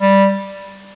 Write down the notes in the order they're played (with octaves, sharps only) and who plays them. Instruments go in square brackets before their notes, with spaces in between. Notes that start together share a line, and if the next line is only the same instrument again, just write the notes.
[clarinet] G3